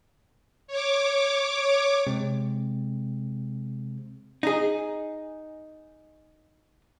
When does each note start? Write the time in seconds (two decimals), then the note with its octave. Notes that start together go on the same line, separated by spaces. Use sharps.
0.68 C#5 D6
2.07 C3 G#3 C4
4.43 D#4 G#4